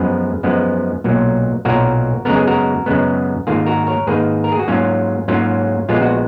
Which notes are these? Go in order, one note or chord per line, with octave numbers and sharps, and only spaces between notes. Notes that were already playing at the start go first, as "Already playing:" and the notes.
Already playing: F#2 F3 G#3 B3 G#4 B4
F#2 F3 G#3 B3
B1 A#2 F#3 A#3
B1 A#2 F#3 A#3 F#4 A#4
F#2 C#3 G#3 B3 A#4
G#4
F#4 A#4
F#2 C#3 G#3 B3
G#2 D#3 A#3 F4 G#4
F#4 A#4
A#4 C#5
G#2 D#3 A#3 G#4 B4
A#4
G#4
F#4
G#2 F#3 A#3 C#4 F4
G#2 F#3 A#3 C#4 F4
A#1 A#2 G#3 B3 F4
F#4